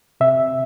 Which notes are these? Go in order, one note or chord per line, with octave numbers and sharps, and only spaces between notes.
C3 E5